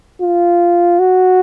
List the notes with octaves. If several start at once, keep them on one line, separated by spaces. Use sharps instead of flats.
F4
F#4